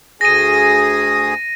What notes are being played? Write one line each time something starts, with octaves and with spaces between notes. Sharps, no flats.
D2 G#4 D#6 A#6 D#7